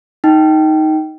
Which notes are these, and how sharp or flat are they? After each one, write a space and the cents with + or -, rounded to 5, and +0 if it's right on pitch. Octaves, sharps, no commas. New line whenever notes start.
D#4 +10 G5 -15